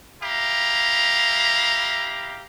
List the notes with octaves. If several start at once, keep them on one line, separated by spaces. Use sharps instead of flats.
E4 G4 F5 A#5